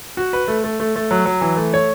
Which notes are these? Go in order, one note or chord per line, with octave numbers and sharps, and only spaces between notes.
F#4
B4
A3
A3
A3
A3
F#3
F#3
E3
A3
C#5